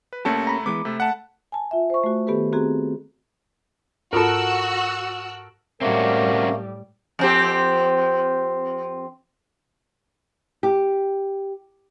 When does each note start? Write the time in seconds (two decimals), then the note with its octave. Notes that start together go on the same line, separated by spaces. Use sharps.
0.13 B4
0.25 C2 A3 A#3 C#4 G4 A5
0.47 A#5 B5
0.66 E3 G#3 B3 D6
0.85 C3 A3
1.00 F#5 A5
1.52 G#5 A5
1.71 F4 E5
1.90 C5 C#6
2.04 A3 F#4
2.27 D#3 B3 G4 A4 B4
2.53 C4 F#4 G#4 A#5
4.13 G#2 F4 F#4 A4 A#4 B5 E6 F#6
5.81 A2 G3 A3 A#3 C4 C#4 F#4 A#4
7.19 F2 C4 G4
10.63 G4